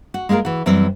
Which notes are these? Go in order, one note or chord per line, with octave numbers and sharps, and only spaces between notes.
F#4
G#3 A#3 E4 F4 A#4
E3 F#4
F#2 E3 G3 C4